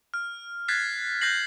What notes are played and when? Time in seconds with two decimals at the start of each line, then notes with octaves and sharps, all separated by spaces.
0.14 F6
0.68 F#6 G#6 A6 B6 C7
1.21 F#6 G6 A#6 C7 F#7